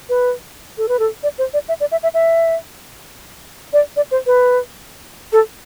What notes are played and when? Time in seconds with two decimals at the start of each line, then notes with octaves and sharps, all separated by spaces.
0.09 B4
0.78 A4
0.89 B4
0.99 A4
1.23 D5
1.38 C5
1.54 D5
1.69 E5
1.80 D5
1.92 E5
2.03 E5
2.14 E5
3.73 D5
3.96 D5
4.11 C5
4.26 B4
5.33 A4